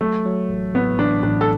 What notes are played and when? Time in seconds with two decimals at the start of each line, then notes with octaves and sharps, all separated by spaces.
0.01 F#3 A3
0.25 F#3
0.49 A1
0.74 A2 B3
0.99 A1 D4
1.23 A1 D4
1.41 A4